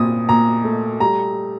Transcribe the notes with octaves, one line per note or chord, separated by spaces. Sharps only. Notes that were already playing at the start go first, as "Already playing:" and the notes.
Already playing: A#2 C4 D#6
A#2 A#5
A3
G3 A#5